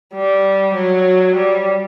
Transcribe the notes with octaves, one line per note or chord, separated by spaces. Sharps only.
G3
F#3
G3